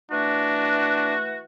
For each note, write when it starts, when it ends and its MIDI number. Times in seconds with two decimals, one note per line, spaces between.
0.11 1.42 52
0.11 1.42 57
0.11 1.14 62
0.11 1.42 66